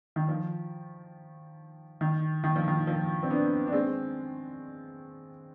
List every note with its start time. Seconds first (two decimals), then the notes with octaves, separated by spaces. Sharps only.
0.16 D#3
0.28 F3
2.01 D#3
2.44 D#3
2.56 F3
2.68 D#3
2.87 F3
3.23 C4
3.30 B3 D4
3.67 D4
3.73 G#3 C4